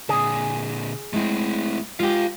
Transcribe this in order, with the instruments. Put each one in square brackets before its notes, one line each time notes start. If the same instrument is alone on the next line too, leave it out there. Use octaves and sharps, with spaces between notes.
[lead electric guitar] A#2 D3 [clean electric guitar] G#4
[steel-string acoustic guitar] G#3 E4 [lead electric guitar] A3 C4
[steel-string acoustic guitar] G#3 [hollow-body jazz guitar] F4 G4 [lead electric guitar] B4 F5